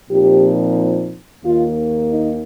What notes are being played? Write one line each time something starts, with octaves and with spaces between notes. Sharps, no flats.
A#2 F3 C4 D#4 G4
D#2 D#3 A#3 F4
D#4